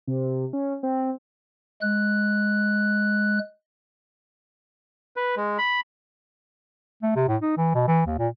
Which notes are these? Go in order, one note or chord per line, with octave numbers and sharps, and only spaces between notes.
C3
C#4
C4
G#3 F#6
B4
G#3
B5
A3
C3
A2
D#4
E3
B2
E3
D#2
A#2